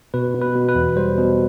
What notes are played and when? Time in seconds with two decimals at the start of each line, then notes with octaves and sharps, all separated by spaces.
0.14 B2 B4
0.35 B2
0.41 B4
0.56 B2
0.69 B4
0.75 E2
0.96 G3 C5
1.18 B2